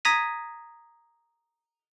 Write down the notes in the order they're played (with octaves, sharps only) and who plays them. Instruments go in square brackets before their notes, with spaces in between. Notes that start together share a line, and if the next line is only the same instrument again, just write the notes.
[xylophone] A#5 D#6 G#6 A#6 B6 D#7